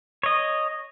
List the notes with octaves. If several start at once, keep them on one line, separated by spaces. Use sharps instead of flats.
C#5 D#5